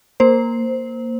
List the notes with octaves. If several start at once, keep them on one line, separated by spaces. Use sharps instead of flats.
A#3 C5